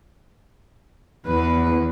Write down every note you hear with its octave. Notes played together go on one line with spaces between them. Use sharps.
E2 B4